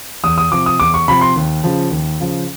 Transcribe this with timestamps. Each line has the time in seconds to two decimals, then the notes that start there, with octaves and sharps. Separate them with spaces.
0.24 E2 D#6
0.38 D#6
0.52 C3 F3 D6
0.66 D#6
0.80 E2 D6
0.94 C#6
1.08 C3 F3 B5
1.21 C6
1.36 D#2
1.64 C#3 F3
1.91 D#2
2.20 C#3 F3